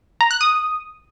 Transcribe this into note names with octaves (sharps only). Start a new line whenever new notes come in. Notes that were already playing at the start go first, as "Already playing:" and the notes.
A#5
F#6
D#6